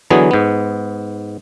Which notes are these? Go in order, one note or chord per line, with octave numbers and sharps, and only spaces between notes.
D3 E3 F#3 B3 G#4
G#2 B3